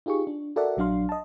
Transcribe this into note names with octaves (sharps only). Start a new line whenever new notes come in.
D#4 F4 G4 G#4 C#6
D4
F#4 A4 A#4 D5 E5 F#5
A#1 F#3 D4 F5 C6
D#5 A5